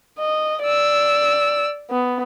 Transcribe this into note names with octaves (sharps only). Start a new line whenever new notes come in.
D#5
D5 E6
B3